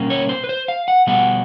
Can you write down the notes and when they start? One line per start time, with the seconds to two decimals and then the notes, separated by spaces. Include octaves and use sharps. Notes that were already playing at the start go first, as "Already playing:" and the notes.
Already playing: B2 G3 A#3 C#4
0.10 C#5
0.29 C5
0.44 B4
0.49 C5
0.68 F5
0.88 F#5
1.07 B2 G3 B3 F#5